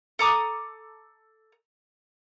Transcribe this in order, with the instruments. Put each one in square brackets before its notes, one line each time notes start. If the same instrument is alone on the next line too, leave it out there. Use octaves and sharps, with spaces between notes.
[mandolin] A4 A#5 D6 D#6